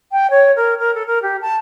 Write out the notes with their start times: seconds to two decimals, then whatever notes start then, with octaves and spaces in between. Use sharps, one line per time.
0.11 G5
0.30 C#5
0.56 A#4
0.79 A#4
0.94 A4
1.06 A#4
1.22 G4
1.41 A5